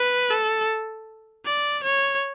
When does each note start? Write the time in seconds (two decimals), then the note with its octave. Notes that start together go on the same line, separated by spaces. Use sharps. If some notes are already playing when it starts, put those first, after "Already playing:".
Already playing: B4
0.30 A4
1.45 D5
1.83 C#5